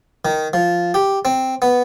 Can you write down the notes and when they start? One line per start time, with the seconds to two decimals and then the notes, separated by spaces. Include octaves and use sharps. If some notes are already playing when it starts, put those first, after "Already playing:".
0.25 D#3
0.53 F3
0.94 G4
1.25 C4
1.62 B3